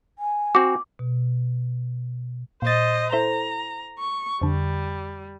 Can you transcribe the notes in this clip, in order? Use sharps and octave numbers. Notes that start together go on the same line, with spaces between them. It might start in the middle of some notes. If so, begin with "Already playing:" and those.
G#5
C4 F#4 D6
B2
A#2 C5 D#5 A6
E4 A4 C5 A#5
C#6
F2 D3 G3